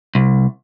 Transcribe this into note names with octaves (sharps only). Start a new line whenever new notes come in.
C2